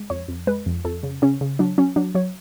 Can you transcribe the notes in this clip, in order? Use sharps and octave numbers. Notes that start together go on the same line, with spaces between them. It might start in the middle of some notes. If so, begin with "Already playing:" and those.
Already playing: G#3
F2 C#5
F2
G#3 B4
F2
F2 A4
C#3
C#3 C#4
C#3
F#3 D4
F#3 C#4
F#3 D4
F#3 C#5